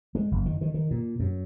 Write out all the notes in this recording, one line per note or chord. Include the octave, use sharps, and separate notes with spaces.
G#3
F#1
D#3
D#3
D#3
A#2
F#2